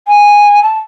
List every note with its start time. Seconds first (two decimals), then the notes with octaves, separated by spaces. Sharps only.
0.07 G#5
0.62 A5